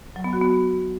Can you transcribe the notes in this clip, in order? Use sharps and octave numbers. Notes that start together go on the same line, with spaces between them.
F#3
B3
F#4
B3